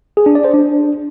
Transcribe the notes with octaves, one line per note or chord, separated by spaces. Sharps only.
G#4
D4
D5
C5
D4